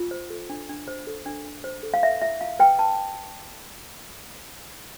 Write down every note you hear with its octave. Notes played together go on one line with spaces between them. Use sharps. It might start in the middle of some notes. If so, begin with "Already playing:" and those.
Already playing: F4
C5
A4
D4
D4
C5
A4
D4
D4
C5
A4
F5
B4 E5
E4 E5
E4 F5
B4 G5
B4 A5